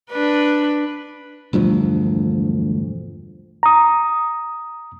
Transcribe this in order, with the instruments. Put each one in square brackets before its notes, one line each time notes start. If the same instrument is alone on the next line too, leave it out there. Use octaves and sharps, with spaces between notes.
[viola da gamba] D4 B4
[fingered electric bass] E1 D2 G2 F3
[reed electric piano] A#5 D#6